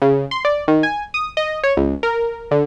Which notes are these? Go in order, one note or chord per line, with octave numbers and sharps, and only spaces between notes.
C#3
C6
D5
D#3
G#5
D#6
D#5
C#5
C#2
A#4
D3